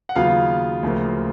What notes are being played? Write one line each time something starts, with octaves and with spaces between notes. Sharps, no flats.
F#5
D#2 C#3 F#3 B3 F4 F5
D2 C#3 F3 A#3